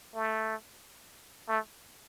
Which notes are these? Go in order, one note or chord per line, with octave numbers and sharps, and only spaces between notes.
A3
A3